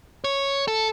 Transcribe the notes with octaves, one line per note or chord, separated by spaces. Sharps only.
C#5
A4